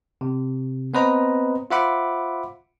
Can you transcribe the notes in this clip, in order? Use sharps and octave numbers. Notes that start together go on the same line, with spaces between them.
C3
B3 C4 B4 C5 D#5 A#5
F4 C5 E5 F#5 B5 D6